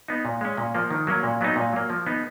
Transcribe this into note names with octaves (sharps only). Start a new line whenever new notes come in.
B3 D#4
A#2
G#3 C#4
A#2
F3 A#3
D#3
F#3 A#3 C#4
A#2
F#3 B3 D#4
A#2
F#3 A#3
F3
B3 D#4